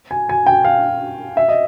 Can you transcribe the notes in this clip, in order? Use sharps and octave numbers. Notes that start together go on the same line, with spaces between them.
G#5
G#5
G5
F5
E5
D#5